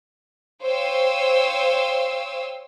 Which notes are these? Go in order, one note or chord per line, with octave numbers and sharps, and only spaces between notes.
C5 C#5 F5 G5 D#6 E6